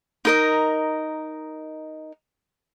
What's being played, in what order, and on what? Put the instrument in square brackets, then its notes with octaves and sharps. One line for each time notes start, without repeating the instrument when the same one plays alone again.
[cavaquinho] D#4 A#4 D#5